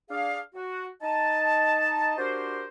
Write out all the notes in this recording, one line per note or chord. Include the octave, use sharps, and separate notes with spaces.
D4 G#4 F5
F#4
D#4 D#5 A5
D4 F#4 G4 A#4 C5